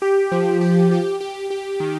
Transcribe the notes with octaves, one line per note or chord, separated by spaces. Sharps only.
G4
F3
G4
G4
G4
G4
D#3